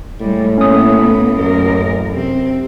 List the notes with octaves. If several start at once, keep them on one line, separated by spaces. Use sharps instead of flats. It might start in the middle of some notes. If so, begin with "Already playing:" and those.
A2 G3 G#3
A#3 B3 C#4 D#6
A1 F#2 A#4
C3 C4